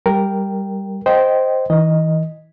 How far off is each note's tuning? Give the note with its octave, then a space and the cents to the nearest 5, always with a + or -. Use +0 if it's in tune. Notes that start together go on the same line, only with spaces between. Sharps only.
G3 +0 A#4 +0 G5 +0
C5 +0 D#5 +0 G5 -15
E3 -35 D#5 +0